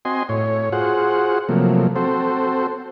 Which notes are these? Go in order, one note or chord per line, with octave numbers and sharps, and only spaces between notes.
C4 F#4 D#5 G#5 C6
A2 C#5
F4 F#4 G#4 C5 F#5
C3 F3 F#3 A3 A#3
C4 F#4 A4 C5